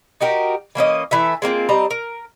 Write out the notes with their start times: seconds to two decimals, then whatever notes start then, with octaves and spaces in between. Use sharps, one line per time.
0.21 D#4 F#4 G4 A#4
0.75 E3 A#3 C#4 D#5
1.11 E3 A3 E5
1.42 G#3 A#3 C4 F4
1.69 G3 C4 D#5 A#5
1.91 A#4